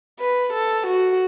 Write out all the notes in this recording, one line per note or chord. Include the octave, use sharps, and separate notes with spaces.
B4
A4
F#4